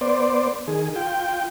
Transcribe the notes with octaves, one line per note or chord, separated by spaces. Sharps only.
B3 C5 D5
D#3 G#4
F4 G5